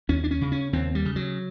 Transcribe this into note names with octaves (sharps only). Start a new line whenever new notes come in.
D#2 C#4
D4
C#4
C#3
C#4
D#2 C4
G3
C#3
F#3